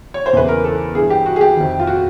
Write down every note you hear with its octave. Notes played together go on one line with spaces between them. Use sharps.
C#5
C5
E2 C#3 E3 B4
A#4
A4
G2 E3 G#4
G4
F#4
G#4
G4
F2 C3 D#3
F4
F#4